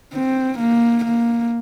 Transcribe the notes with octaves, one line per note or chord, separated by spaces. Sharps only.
C4
A#3
A#3